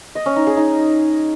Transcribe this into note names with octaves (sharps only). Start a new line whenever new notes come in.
D#5
C#4
D#4
G#4
D#4